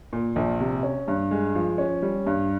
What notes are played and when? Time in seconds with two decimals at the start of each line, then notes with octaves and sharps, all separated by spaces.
0.13 A#2
0.36 A#1
0.60 C3
0.83 C#4
1.08 G2
1.31 G#3
1.55 F3
1.78 C#4
2.02 G3
2.26 G2